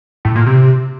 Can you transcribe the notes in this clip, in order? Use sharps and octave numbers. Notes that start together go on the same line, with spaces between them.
A2
A#2
C3